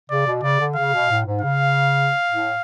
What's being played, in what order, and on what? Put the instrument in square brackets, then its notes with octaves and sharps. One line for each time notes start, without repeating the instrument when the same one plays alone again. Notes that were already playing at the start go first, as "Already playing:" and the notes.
[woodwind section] C#3 [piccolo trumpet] D5
[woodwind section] B2
[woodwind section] C#3 [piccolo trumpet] D5
[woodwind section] D3
[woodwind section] C#3 [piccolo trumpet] F5
[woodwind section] B2
A2
G#2
[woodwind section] C#3 [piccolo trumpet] F5
[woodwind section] A2